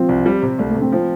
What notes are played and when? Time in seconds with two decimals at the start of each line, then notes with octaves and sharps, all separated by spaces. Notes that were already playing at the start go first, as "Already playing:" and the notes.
Already playing: F3 C4
0.09 C2
0.26 G3
0.43 C3
0.59 C2 A3
0.70 A3
0.75 C3
0.81 C4
0.92 F3 C4